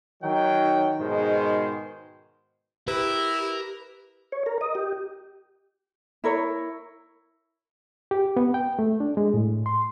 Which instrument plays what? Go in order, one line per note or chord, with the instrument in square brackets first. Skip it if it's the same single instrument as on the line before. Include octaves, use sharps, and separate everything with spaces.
[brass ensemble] D#3 F#3 G5
G#2 B2 D#3 G#3 C5
[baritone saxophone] E4 [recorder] G4 [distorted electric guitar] A#4 [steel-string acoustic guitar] B4
[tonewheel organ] C#5
A#4
D#5
G4
[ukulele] E4 A#4 C#5
[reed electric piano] G4
B3
G5
A3
D4
G#3
A2
C6